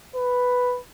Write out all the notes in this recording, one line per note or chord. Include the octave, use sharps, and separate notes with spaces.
B4